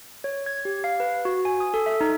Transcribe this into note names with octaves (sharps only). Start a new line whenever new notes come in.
C#5
G#6
G4
F5
B4
F#4
G#5
D#6
A4
E5
D#4